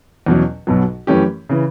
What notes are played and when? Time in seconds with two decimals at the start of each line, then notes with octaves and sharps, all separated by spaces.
0.26 E2 B2 F#3 C#4
0.67 B1 B2 F#3
1.07 F#2 E3 A3 C#4 G4
1.49 C#3 E3